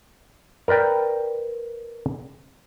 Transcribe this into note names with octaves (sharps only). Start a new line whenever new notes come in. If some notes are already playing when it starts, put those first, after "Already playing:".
A#4 B4 D5 G5